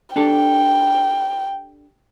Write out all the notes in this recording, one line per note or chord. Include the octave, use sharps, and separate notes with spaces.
D4 G4 A4 G5